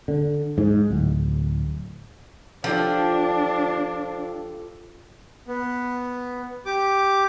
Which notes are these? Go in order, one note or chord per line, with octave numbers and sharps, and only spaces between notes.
D3
G#2
D1
F3 D4 F4 G4 A4
B3
G4 D6